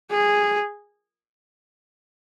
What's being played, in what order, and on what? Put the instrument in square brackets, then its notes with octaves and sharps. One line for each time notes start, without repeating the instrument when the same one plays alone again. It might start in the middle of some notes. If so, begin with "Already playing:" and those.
[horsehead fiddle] G#4